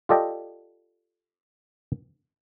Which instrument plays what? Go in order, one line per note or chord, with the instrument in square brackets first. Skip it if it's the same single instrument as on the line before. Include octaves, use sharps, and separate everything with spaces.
[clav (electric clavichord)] F4 G4 A4 D5 D#5 G5